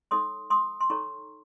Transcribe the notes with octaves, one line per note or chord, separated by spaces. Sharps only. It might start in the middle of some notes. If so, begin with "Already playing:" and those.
D#4 A4 C#5 C6 D#6
C6 D#6
C6
D#4 A4 C#5 A#5 C#6